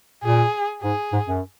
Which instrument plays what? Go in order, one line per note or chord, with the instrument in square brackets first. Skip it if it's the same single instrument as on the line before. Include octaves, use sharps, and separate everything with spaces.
[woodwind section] A#2 [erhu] G#4
[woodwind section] G#2 [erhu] G#4
[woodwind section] G#2
F#2